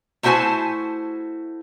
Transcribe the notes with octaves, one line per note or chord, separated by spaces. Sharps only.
A3 E4 F#4 C5 G#5 A5